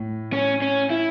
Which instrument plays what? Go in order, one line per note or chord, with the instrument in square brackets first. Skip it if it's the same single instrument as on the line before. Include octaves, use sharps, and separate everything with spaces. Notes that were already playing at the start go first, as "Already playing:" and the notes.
Already playing: [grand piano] A2
[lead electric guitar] C#4
C#4
E4